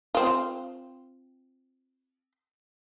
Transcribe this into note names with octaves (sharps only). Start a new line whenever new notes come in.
C4 F4